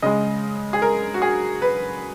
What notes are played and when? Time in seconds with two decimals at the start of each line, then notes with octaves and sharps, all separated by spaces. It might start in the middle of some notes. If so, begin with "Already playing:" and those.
0.02 C#3 G#3 D#5
0.73 G#4
0.82 A#4
1.14 F#4
1.22 G#4
1.62 B4